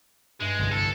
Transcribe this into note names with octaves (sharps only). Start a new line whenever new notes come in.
G2 G#3 E5 A#6
G1 C2 F2 G6 A#6
A4